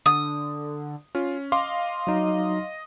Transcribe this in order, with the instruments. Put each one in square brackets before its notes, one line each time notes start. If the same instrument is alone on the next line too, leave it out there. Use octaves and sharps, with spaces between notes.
[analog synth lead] D3 [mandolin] D#6
[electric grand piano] C#4 [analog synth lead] F4
[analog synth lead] D#5 [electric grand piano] F5 C6 D6
[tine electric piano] F#3 D#4